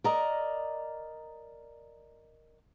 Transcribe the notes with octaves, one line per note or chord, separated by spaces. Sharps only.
A#4 D5 D#5 A#5